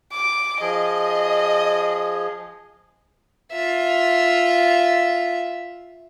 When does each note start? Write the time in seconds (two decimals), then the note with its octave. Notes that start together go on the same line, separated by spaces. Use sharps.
0.13 D6
0.61 F3 G#4 D#5
3.52 F4 E5